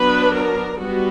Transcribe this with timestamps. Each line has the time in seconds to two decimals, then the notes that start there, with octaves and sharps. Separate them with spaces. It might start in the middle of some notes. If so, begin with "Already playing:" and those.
Already playing: F#3 B3 D4 B4
0.34 A#4
0.80 G3 B3 F#4